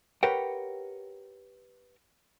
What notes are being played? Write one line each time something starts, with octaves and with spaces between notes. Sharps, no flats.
G4 A#4 B4 C#5 F#5 G5